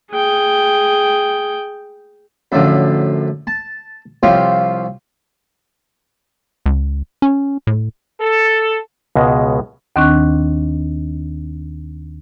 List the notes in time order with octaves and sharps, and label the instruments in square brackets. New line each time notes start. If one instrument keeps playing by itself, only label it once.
[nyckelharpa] G#4 G5
[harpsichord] F#2 A2 D3 F3
A5
C2 F3 F4 G4 C#5
[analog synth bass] C#2
C#4
A2
[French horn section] A4
[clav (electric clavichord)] C#2 B2 G#3
[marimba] D#2 D#3 C4 D4 C#6 F#6